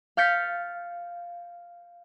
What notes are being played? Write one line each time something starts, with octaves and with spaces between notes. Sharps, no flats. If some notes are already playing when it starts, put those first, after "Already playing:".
F5 F6 G6 A6 B6 C#7